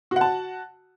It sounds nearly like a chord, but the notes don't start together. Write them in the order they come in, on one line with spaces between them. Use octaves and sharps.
F#4 F#5 A5